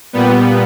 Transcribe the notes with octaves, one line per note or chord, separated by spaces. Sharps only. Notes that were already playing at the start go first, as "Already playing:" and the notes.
A#2 G3 B3